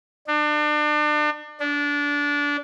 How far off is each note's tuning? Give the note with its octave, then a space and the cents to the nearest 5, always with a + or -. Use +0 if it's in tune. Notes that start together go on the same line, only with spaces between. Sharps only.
D4 +35
D4 -20